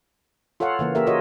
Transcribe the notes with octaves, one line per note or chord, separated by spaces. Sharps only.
F4 A4 C#5 F5 F#5
C#3 E3 A#3
A#3 G4 A#4 E5
F4 F#4 G#4 A#4 C#5 D#5